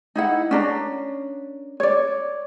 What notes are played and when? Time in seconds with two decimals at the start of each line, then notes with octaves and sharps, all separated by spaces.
0.16 D#4 E4 F#5
0.51 C#4 D4 A#4
1.80 C#5 D5